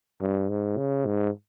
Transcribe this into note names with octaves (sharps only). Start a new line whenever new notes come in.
G2
G#2
C#3
G#2